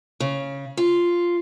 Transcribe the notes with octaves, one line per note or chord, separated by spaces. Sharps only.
C#3
F4